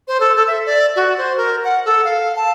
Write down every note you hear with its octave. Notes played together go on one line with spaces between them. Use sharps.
C5
A4
A4
E5
D5
F#4
C5
A#4
F#5
A4
F5
A5